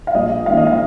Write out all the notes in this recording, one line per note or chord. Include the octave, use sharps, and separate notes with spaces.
F5
A#1 D#5
G#2 D#3 A#3 C#4 F5
D#5
F5